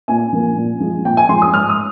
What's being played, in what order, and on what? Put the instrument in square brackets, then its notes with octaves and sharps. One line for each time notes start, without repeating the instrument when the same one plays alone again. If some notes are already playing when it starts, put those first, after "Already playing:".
[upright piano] A#2 G#5
F3 A#3
A#2
F3 G#3
A#2 G5
G#5
F3 G#3 C6
D#6
G#2 F6
D#6